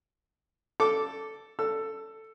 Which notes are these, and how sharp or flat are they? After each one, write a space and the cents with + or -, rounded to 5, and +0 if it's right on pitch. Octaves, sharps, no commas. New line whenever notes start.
A4 +0 D6 -10
A4 +5 E6 +15